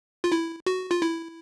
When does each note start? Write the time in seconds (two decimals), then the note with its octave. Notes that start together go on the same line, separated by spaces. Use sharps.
0.24 F4
0.32 E4
0.66 F#4
0.91 F4
1.02 E4